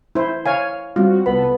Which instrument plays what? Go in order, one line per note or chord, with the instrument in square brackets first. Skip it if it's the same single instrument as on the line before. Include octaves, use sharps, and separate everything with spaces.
[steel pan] E4 C5
C#5 F5 G#5
[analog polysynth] G3 C4 F#4 [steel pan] F4
[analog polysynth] C2 A4 B4 [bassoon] B3 [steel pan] B5